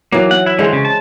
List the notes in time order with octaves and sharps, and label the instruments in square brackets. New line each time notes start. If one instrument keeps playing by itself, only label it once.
[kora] E3 F#3 [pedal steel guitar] A#3
[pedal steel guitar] F#5
E4
[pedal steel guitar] D3 E3 [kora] G#3 C5
[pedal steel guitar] C#3
A5